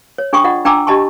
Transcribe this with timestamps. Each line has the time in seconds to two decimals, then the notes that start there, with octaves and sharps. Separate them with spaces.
0.18 C#5
0.33 D4 G#4 G5 B5 C#6 D#6
0.44 F4 D5 D#5 F#5
0.65 D4 G5 G#5 A#5 D6 E6
0.87 D4 G4 D#5 A5 B5 C#6